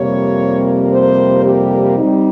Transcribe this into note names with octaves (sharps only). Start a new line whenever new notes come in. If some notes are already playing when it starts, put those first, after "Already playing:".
Already playing: F2 C3 G3 A#3 C#5
C5
G4
G3 C4 D#4